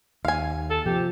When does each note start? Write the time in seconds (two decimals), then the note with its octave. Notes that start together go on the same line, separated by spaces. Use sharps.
0.25 D#2 F5 G#5
0.70 A4
0.86 C3 F3 G4